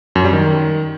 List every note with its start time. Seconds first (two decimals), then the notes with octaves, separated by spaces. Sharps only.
0.16 F#2
0.24 G3
0.33 D#3